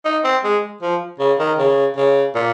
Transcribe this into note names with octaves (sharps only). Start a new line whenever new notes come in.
D#4
C4
G#3
F3
C#3
D#3
C#3
C#3
A#2